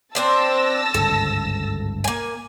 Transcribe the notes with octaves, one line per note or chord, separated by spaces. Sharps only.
C4 D4 C5 A5 E6 A#6
G1 C#2 G#2 A4
A#3 G#5